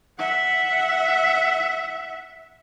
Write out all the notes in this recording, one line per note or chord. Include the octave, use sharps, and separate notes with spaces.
E5 F#5